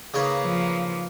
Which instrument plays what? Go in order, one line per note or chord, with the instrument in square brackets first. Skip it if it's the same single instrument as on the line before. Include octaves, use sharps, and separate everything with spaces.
[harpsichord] C#3 D#4 C#5 [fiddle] A#3 B4
[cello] F3